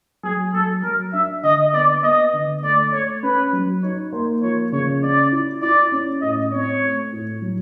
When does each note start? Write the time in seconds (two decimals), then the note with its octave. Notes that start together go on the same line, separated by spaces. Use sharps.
0.23 F#3 G#4
0.53 F#3 A4
0.83 F#3 A#4
1.13 D4 E5
1.43 D3 D#5
1.73 B3 D5
2.03 B3 D#5
2.33 D3
2.63 A3 D5
2.92 A3 C#5
3.23 C#4 B4
3.53 F#3
3.83 D#4 C#5
4.12 A#3 C5
4.42 F3 C#5
4.72 C#3 C#5
5.02 C#4 D5
5.32 E4
5.62 E4 D5
5.92 C#4
6.21 A2 D#5
6.51 C4 C#5
6.82 A3
7.12 A2
7.42 F#3